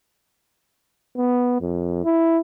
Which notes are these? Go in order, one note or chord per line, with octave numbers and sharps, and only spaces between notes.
B3
F2
E4